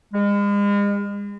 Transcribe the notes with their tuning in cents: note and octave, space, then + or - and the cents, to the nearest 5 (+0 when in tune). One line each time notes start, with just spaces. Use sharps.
G#3 -40